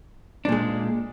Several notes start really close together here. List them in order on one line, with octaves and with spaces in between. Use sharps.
D4 A#2 G#3